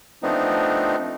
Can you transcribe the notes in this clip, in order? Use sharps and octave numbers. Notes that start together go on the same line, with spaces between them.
F3 A3 B3 C4 D4 D#4